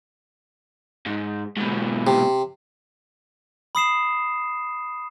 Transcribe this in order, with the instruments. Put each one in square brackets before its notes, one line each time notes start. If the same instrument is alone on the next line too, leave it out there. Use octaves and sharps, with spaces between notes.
[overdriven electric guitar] G#2
G#2 B2
[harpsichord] C3
[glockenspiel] B5 D#6 C7 E7